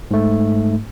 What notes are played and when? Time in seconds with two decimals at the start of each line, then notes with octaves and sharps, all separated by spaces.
0.11 G#2 A3